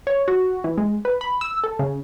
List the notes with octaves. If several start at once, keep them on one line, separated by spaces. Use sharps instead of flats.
C#5
F#4
E3
G#3
B4
B5
E6
A4
C#3